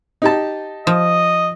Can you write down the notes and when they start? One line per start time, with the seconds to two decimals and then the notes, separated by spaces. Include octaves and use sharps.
0.22 D#4 G4 A5
0.87 F3 D#5